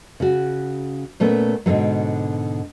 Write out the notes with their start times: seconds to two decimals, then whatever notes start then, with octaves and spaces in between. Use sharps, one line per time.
0.20 C#3 F#4
1.20 A#2 A3 B3 C#4
1.66 G#2 B2 D3 E3 F#3